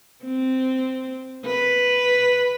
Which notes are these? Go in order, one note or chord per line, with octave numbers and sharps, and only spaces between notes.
C4
B4